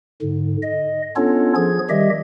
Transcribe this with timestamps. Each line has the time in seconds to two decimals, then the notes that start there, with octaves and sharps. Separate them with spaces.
0.22 G#2 D3
0.62 D#5
1.16 B3 C#4 D4 F4 A4 C#5
1.56 F3 G#4 G#6
1.90 D#3 G3 G4 D#5 E5